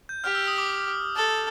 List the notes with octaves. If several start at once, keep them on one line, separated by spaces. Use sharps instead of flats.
G6
G4 F6
E6
D#6
D6
A4